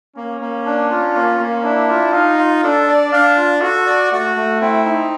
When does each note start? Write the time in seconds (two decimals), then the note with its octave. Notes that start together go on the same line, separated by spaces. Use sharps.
0.16 A#3 C#4
0.41 A#3
0.66 D4
0.90 F4
1.15 A#3
1.40 A#3
1.64 D4 E4
1.89 F4
2.13 D#4 F5
2.39 F4
2.63 D4 A4
2.87 D5
3.12 D4 F5
3.37 F4
3.61 F#4 A4
3.86 D5
4.11 A3 F#4
4.36 A3
4.61 C4 E4
4.86 D#4